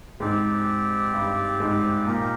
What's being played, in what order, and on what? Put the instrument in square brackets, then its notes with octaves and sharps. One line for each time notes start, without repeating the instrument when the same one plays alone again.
[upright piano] G#2 [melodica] C4 G4 D5
[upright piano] G2
G#2
[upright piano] A#2 [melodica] D#4 G4 A#4